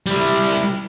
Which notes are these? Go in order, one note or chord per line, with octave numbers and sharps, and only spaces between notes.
G3 E4